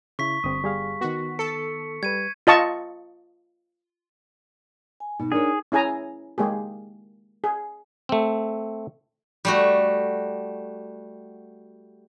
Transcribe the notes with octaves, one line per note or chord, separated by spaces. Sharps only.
C#3 E4 C#6 B6
G1 C4 D#6
G3 G#4 F5
D#3 B3 F#4
A4 C#7
G3 B4 G#6 D#7
F4 D#5 A5 C#6
G#5
B2 D#4
D4 G#4 A#4 C#5
C#4 E4 G#4 G#5 A#5
G#3 A#3 G4 G#4
G#4
A3 C4
G3 A3 F#4